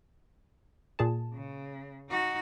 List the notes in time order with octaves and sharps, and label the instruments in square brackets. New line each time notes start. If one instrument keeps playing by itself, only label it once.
[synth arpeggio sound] A#2 G#4 A5
[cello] C#3
D#4 F#4